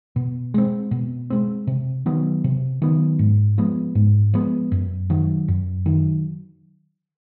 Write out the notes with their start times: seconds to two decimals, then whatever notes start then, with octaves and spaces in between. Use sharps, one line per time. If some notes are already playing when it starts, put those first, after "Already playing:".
0.16 B2
0.54 G#3 C4
0.91 B2
1.30 G#3 C4
1.67 C3
2.06 D#3 F#3 B3
2.44 C3
2.82 D#3 F#3 B3
3.19 G#2
3.58 F3 G#3 B3
3.95 G#2
4.34 F3 G#3 B3
4.72 F#2
5.10 D#3 F#3
5.48 F#2
5.86 D#3 F#3